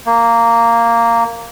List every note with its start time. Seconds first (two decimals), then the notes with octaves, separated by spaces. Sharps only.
0.06 A#3